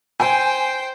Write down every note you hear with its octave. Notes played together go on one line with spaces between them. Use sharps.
C5 G5 G#5